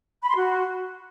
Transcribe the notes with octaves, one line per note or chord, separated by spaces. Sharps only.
B5
C6
F#4